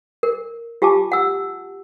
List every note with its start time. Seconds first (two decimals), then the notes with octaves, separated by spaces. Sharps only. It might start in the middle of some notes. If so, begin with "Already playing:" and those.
0.23 A#4
0.82 F4 G4 G#5 A5 D6
1.12 F#5 E6